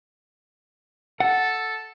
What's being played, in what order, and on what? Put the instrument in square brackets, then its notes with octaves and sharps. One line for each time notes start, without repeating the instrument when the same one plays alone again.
[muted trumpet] A4 [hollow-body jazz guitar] F#5